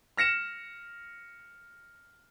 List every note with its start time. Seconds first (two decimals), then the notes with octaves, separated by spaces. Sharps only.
0.17 F6 A#6 C#7 E7